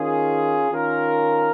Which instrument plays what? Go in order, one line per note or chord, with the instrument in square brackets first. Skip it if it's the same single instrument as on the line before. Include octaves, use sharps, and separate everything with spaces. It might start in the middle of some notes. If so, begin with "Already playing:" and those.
Already playing: [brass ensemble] D#3 C#4 F4 G#4
D#3 C#4 F4 A#4